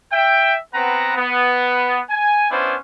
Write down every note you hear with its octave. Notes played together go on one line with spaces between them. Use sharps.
E5 G5
B3 C4 B4 F#5 A#5
B3
G#5
B3 C#4 D4 E4 C5